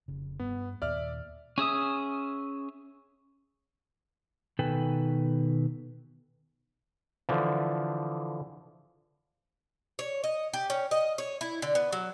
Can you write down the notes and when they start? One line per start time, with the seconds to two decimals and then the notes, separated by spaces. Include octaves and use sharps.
0.08 F1 C#3
0.39 G2 B3
0.82 D#2 A#2 D5 E5 F6
1.58 C#4 G#4 E5 D#6
4.59 B2 D#3 A4 B4 G5 G#5
7.29 D3 E3 F3
9.99 C#5
10.24 D#5
10.53 G4
10.70 C#4
10.91 D#5
11.18 C#5
11.41 E4
11.62 D3
11.75 B3
11.92 F#3